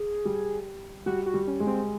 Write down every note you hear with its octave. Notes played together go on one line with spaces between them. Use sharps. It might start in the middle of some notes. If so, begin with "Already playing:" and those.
Already playing: G#4
G3
G3 F#4
F#4
G3
C#4
G#3
C4